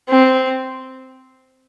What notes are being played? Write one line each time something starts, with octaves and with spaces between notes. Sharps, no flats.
C4